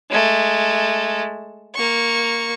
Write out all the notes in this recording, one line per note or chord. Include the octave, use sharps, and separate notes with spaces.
G#3 A3
A#3 C#6